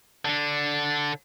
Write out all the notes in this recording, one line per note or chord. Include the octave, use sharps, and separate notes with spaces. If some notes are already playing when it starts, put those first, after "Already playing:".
D3 D4